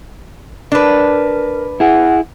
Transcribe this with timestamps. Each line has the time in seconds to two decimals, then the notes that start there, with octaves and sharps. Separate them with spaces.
0.72 D4 A#4 B4
1.80 E4 G#4 F#5